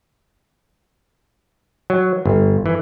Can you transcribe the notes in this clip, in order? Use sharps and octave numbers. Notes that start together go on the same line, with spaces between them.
F#3
G1
E3